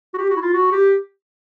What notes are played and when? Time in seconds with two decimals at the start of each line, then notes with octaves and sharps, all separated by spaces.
0.14 F#4
0.17 G4
0.30 F#4
0.36 E4
0.41 F4
0.53 F#4
0.72 G4